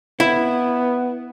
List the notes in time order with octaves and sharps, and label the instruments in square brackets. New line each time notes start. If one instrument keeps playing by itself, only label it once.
[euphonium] B3 [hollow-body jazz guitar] E4